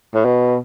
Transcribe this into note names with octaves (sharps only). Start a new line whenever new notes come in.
A2
B2